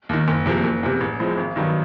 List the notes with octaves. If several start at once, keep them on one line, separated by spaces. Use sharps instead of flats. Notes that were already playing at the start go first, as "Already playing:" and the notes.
D#2 D#3
F#1
E2 C3 F3 A#3
F#1
E2 C3
A1
A2 F3 G#3 C4
G#1
G2 D#3 F#3 B3